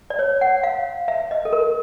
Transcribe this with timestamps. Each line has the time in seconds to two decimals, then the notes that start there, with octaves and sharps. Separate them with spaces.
0.10 D5
0.19 C#5
0.41 F#5
0.63 F5
1.08 E5
1.31 D#5
1.45 A4
1.53 A#4